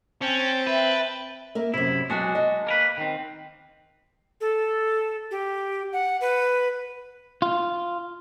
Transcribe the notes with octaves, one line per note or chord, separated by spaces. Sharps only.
C4 C#4 G5 A5
B4 E5
A#3 A#4 E5
F#2 C3 E4
B2 F#3 G#3 D4 F#4 G#5
D#5
A#3 A#4 B4
D#3 C4
A4
G4
F#5
B4
F4